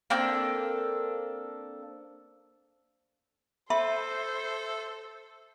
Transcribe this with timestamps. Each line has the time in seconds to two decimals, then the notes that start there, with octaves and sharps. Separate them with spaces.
0.10 A#3 C4 D4 A4
3.70 A4 C5 E5 B5